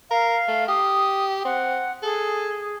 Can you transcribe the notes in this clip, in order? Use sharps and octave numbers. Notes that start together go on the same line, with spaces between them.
A#4 F5
A3
G4 D#6
C4 F#5
G#4 A4